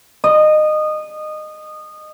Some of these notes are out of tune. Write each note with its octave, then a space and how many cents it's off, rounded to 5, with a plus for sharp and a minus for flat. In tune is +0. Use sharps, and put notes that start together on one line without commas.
D#5 -20